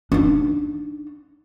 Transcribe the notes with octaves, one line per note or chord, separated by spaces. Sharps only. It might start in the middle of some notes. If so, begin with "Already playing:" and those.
D4 D#4